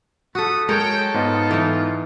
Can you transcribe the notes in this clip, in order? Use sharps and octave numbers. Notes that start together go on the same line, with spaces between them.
A3 F#4 A4 B5 D#6
G#3 A4 A#4 C#5 G5
G#2 B3 F4 D#5
E3 D#4